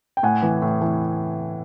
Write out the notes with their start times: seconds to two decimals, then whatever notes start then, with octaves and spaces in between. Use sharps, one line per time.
0.17 G5
0.23 A2 F#5 G#5
0.43 E3
0.62 A2
0.81 E3